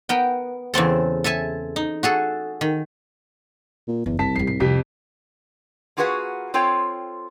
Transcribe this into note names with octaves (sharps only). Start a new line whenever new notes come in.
B3 A#4 G5
E2 C#3 C4 A4
A4 E5 G#5 A5
D#4
F#4 G#4 A4
D#3
A#2
F#1 E2
C2 A5 B6
F2 G3 C7
G#2 C7
F2 C3 G4 B6
A#3 F4 F#4 G#4 B4 F#5
C4 F4 A4 C#5 G5